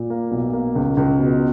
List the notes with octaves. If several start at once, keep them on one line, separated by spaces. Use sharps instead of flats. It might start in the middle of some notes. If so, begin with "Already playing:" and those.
Already playing: A#2
A#3
B1
A#3
C#2
C#2
B2